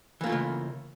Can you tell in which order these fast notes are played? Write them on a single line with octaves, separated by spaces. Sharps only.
E3 A#3 F4 A3 C#3